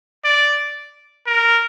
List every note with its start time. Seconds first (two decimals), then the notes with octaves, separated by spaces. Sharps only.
0.24 D5
1.27 A#4